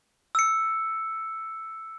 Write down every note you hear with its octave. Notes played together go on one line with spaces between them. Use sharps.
E6 C#7